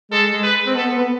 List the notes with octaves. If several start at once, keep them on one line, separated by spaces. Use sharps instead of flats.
G#3 A4
G#3
B4
C4
B3 A4
B3